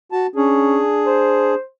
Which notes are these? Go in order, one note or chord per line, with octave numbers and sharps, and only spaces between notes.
F#4 A5
C#4 D4 G#4
C5